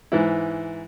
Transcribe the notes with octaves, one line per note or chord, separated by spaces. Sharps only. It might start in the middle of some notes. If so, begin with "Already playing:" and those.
G#2 E3 E4